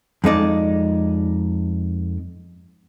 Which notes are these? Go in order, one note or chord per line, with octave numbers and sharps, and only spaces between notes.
F2 G#3 D#4 D5